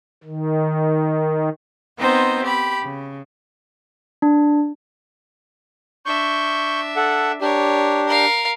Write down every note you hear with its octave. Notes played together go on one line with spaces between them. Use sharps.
D#3
B3 C4 D#4 C5
G4 B5
C#3
D4
D4 E5 C#6 G6
A4 F#5
D4 G4 A#4 C#5
A#4 F5